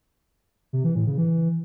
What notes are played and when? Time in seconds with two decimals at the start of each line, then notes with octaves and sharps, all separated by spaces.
0.73 C3
0.84 E3
0.95 A2
1.07 C#3
1.18 E3